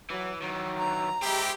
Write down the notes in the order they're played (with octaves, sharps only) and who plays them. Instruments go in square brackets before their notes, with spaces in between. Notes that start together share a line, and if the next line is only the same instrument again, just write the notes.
[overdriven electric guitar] E3 [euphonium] F#3
[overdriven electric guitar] D#3 E3 [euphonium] F#3
[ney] A#5
[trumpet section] G#3 G4 [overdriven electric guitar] C4 E4